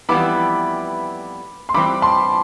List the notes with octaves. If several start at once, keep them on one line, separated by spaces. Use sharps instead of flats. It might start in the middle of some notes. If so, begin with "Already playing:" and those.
F2 E3 G3 B3 E4 B5 D6
C6
G2 E3 G3 C4 B5 D6
A5 C6